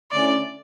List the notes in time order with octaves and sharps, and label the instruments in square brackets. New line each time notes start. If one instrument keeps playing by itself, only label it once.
[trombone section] D3 A3 C#4 E4 [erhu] D5